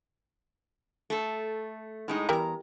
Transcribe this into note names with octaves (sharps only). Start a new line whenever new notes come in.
A3 A4
A2 G#3 D#4
E2 G3 E4 A#4 A#5